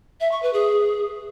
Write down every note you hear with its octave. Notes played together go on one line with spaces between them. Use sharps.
E5
C#6
B4
G#4